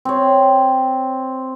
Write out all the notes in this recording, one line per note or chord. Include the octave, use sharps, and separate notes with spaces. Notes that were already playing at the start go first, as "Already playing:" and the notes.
C4 C#5